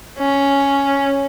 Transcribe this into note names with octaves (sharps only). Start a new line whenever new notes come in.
C#4